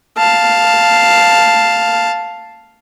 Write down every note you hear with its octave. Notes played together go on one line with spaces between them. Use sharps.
F5 A5